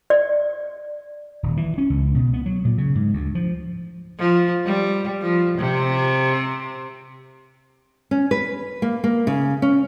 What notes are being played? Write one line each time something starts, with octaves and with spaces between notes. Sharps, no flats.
D5
D#1
E3
C#4
C#2
B2
B3
F#3
A#2
C#3
G#2
D2
F3
F3
G3
F3
C3
C#4
B4
A#3
A#3
C#3
C#4